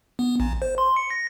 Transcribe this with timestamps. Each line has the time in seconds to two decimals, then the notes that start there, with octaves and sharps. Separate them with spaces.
0.19 B3
0.40 A1
0.62 C5
0.78 C6
0.96 C#7
1.10 A#6